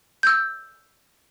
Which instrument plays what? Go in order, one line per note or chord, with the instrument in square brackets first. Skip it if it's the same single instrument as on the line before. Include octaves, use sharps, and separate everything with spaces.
[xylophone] E6 G6